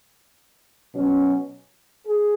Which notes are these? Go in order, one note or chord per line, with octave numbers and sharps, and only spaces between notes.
B2 F#3 C#4
G#4